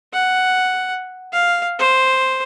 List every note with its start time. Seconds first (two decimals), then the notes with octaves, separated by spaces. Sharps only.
0.13 F#5
1.33 F5
1.79 C5